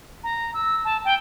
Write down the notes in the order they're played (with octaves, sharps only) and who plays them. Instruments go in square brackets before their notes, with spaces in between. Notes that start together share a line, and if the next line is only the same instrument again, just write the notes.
[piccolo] A#5
E6
A5
G5